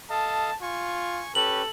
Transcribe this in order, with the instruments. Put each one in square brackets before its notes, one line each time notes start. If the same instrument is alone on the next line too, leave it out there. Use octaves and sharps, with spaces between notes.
[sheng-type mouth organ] A4 D#5 F5 [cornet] A5
[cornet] F4 [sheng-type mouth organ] G#5 C#6
[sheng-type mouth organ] C#4 G4 B4 [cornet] A4 [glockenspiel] F#7